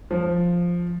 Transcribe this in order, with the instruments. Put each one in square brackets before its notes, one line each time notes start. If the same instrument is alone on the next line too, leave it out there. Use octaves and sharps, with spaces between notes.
[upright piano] F3